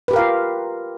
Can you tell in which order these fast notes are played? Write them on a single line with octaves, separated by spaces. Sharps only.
B4 G4 A#4 F5 F4